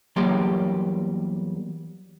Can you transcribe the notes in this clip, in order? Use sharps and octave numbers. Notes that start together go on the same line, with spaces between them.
E2 F#3 G3 A#3 G4 C6